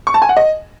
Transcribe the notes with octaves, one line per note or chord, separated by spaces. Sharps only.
C#6
A5
G#5
F#5
D#5